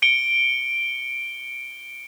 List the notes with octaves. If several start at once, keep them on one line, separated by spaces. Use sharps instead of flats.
C#7 D7 G7